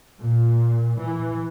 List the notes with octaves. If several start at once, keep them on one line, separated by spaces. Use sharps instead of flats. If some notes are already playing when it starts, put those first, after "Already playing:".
A#2
E3